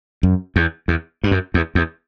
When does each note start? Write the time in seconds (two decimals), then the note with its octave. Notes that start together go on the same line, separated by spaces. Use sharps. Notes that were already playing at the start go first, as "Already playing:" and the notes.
0.23 F#2
0.56 E2
0.88 E2
1.24 G2
1.31 F#2
1.54 E2
1.75 E2